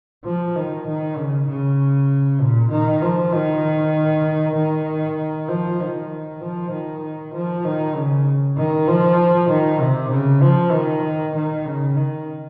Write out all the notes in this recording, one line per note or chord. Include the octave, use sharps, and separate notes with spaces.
F3
D#3
D#3
C#3
C#3
A#2
D#3
F3
D#3
D#3
F3
D#3
F3
D#3
F3
D#3
C#3
D#3
F3
D#3
C3
C#3
F3
D#3
D#3
C#3
D#3